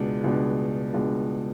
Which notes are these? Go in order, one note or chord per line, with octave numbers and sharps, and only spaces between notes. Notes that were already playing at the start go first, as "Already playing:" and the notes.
Already playing: C#2 B2 G#3 D4
C#2 B2 G#3 D4
C#2 B2 G#3 D4